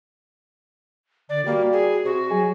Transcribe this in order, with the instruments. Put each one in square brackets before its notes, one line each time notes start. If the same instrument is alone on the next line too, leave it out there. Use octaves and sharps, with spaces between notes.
[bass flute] D3 [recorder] D5
[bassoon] G3 [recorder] A#3 [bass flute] F#4
[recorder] G#4
[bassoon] C3 [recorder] F#4
[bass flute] F#3 [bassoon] G#4